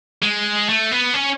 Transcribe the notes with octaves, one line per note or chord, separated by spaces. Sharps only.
G#3
A3
B3
C#4